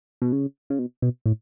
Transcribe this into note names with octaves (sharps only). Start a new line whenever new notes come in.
B2
C#3
C#3
B2
B2
A2